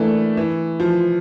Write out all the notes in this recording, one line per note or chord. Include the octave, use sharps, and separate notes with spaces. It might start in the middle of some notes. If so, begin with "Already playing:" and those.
Already playing: E3 A3 A#3 D4
E3
F3